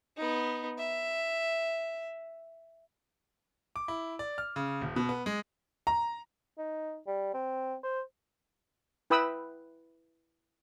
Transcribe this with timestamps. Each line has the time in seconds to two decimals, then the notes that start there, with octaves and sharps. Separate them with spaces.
0.17 B3 D#4
0.79 E5
3.76 D6
3.88 E4
4.19 D5
4.38 F6
4.56 C#3
4.81 D#1
4.96 B2
5.09 B3
5.26 G#3
5.87 A#5
6.58 D#4
7.07 G3
7.34 C4
7.83 C5
9.10 E4 B4 G5 B5 D#6 E6